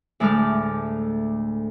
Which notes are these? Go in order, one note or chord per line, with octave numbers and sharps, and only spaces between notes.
D2 A2 G#3 A4 D6 F6